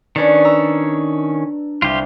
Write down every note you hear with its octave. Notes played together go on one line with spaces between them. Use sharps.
D#3 C#4 D4 B4 D5
A#5 E6
C2 F4 G4